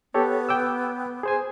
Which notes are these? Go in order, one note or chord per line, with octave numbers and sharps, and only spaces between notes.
B3 G4 A4 C#5
G5 D6 E6
G#4 C5 G#5